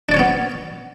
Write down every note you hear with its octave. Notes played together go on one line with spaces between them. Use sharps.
B3 C#4 D4 C#5 D5